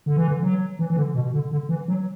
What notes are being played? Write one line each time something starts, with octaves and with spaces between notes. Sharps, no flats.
D3
E3
D3
F#3
E3
E3
D3
B2
D3
D3
E3
F#3